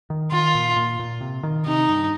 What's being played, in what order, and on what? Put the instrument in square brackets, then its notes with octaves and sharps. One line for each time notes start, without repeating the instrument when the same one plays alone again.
[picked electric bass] D#3
[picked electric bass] D#3 [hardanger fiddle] F4
[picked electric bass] A#2
A#2
A#2
C3
D#3
[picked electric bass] C3 [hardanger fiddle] D#4
[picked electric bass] G2